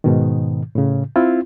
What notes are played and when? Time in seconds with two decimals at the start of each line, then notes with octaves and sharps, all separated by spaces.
0.04 G#2 B2 D#3
0.75 A2 C#3
1.16 C4 E4 F4